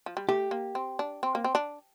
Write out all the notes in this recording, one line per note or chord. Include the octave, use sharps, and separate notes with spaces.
F3
G3
A3 G4
A#3
C4
D4
C4
A#3
C4
D4